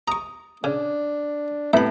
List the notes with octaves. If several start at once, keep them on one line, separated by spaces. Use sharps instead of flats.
A#5 C#6 D#6
C#3 D4
A2 C3 B3 E5 B5